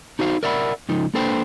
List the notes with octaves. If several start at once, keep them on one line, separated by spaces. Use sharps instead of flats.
D#4 F#4 C5 F5
A#4 D5 E5 F#5 A#5 B5
C#2 F3 D#4
A#3 D4 A4 B4 C5 G5